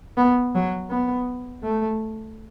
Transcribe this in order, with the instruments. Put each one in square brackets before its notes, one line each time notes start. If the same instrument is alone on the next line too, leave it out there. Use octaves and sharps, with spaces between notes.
[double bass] B3
F#3
B3
A3